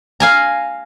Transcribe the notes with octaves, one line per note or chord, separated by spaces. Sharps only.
F5 G#5 A#5